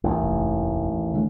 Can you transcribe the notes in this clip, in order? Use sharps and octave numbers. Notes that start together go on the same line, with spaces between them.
A1 D#2
F1 E3
D3 G#3 A3